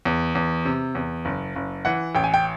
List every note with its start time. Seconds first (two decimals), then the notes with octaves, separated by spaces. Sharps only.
0.05 E2
0.35 E2
0.65 C3
0.95 E2
1.25 F#1
1.56 F#1
1.85 E3 F#5
2.15 A1 G5
2.24 G#5
2.34 G5